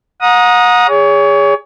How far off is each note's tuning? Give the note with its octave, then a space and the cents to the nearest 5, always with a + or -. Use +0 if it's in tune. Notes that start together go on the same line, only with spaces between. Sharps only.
F#5 -35 A#5 +20 D#6 +0
G#4 -25 C#5 +30